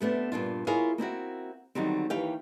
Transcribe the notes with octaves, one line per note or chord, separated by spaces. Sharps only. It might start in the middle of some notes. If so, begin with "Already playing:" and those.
C3 A3 B3 D4
G2 A#2 D4 F4
E4 F4 G#4 A#4 C#5 F5
A#3 C4 E4 F#4
D3 D#3 F#3 G3 C4
D#2 E3 G4 C#5 F5 G5